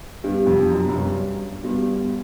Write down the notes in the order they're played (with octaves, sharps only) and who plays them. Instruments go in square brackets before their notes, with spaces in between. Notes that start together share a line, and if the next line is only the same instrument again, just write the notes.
[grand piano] G2 [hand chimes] B3 D4 G4
[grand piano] F2
F#2
F#2
G2
[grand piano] G2 [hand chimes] B3 D4 F#4